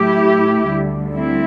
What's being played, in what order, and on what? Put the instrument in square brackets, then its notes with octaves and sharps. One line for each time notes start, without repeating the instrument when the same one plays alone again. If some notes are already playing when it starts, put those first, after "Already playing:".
Already playing: [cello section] A2 F#3 A3 E4 G4
D2 D3 G3
C4 E4